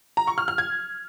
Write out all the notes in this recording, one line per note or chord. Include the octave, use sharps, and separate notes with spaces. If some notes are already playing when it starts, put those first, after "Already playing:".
A#5
C#6
F6
F6
G#6